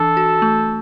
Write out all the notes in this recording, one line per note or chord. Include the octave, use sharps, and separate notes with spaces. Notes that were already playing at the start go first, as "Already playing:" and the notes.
Already playing: E3 D4 A4
F#4
A3